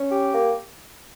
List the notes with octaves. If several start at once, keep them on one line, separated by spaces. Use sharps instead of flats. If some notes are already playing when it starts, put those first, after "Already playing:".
Already playing: C#4
G4
A#3